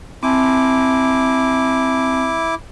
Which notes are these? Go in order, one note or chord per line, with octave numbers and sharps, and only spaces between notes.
C4 E4 G#5 A5 D6